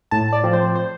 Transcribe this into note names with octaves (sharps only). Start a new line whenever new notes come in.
A2 A5
D5
F3 C4
C5
C5